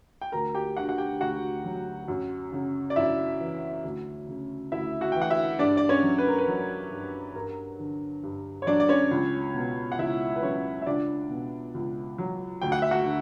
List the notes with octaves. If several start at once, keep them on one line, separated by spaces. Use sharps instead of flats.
G5
D2 A#4 A#5
G4 G5
D3 F#4 F#5
F#5
G4 G5
D2 F#4 F#5
F#3
F#2
C#3
D5
F#2 E4 E5
E3
D2
C#3
D2 E4 E5
F#4 F#5
E3 G5
F#5
E4 E5
G2 D4 D5
D5
C#4 C#5
F#3
B4
A#4
B4
F#3
G2
G2 A#4
D3
G2
C#5
F#3 D4 D5
D5
C#4 C#5
C#2
B2
F#5
C#2 E4 E5
B4
F#3 C#4 C#5
E5
C#2 D4 D5
B2
C#2
F#3
D2 G5
F#5
E5
F#4 F#5
D3